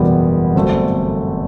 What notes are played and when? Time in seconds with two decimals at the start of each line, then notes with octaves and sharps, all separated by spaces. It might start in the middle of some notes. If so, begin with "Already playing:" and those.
Already playing: F#1 E2 B2 G3 B3
0.55 G1 G2 F#3 A3 C4